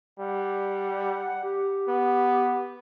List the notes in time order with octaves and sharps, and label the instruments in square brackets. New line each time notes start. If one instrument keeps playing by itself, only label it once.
[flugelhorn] G3 [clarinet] F#5
[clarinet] G4
[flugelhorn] B3